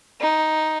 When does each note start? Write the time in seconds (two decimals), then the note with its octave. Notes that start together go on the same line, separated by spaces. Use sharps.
0.20 D#4